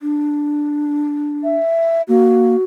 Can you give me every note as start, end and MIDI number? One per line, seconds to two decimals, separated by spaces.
0.01 1.57 62
1.44 2.02 76
2.09 2.55 58
2.09 2.64 66